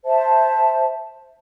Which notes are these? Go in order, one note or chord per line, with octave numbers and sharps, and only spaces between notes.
C5 E5 A5